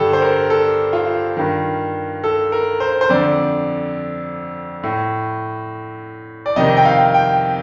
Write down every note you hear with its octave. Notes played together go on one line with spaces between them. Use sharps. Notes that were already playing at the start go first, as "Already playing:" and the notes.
Already playing: G2 D3 G4 A4
C5
A#4
A4
F4
G2 D#3
A4
A#4
C5
C5
F2 D3 D5
A2
D5
F2 C3 D#3 D#5
G5
F5
G5